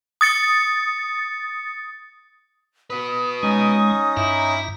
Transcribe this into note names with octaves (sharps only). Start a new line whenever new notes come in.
D#6 A6 C#7
F#4 B4 D#6
G#3 C#4 D#4
G2 E4 A#5